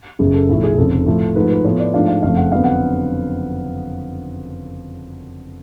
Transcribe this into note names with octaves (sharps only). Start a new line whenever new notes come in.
F#1 F#2 C#3 G#4
A4
B1 A2 F3 A3 A4
G#4
F1 F2 C#3 A4
A2 F3 A3 F4
G#2 F3 A3 B4
B4
A2 F3 B3 F4 C#5
D5
G#2 F3 A3 D4 F4 F5
F5
F#1 F2 F3 A3 F4 F5
F#5
F2 D3 F#3 B3 D4 F5
F#5